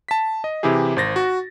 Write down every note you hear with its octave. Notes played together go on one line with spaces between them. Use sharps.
A5 B6
D#5
C3 E3 E4 G4 G#4
G#1 C5 A6 A#6
F#4